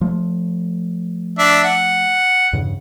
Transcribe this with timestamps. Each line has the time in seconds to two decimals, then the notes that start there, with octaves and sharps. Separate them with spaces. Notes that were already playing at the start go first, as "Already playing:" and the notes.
0.01 F3 A3
1.39 D4 E5
1.64 F#5
2.53 E2 G2 C#3